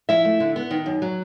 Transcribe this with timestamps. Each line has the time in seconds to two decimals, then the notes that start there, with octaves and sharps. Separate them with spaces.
0.09 F3 E4 E5
0.25 A3
0.40 D3
0.56 B3
0.71 D#3
0.86 F#2
1.02 F#3